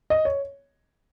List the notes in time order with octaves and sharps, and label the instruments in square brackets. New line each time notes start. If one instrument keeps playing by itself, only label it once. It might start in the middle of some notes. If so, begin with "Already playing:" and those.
[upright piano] D#5
C#5